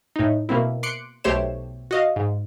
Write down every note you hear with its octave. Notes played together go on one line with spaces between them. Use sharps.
A2 D#4
B2 A#3 C4 E4
C6 D6 F#6 C#7 D7
B1 A3 G4 C5 C#5 E7
F#4 D#5 F5
G#2